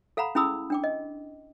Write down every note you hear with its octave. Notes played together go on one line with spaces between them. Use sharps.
A4 F5 F#5 A#5 B5
C#4 E4 G#4 B5 D#6 E6
D4 G5 D6
D#5